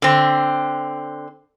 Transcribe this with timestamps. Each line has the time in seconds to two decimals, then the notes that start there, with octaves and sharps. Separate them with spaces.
0.02 D3 C4